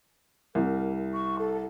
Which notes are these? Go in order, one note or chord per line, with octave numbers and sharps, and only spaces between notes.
C2 A#4
C#6
A4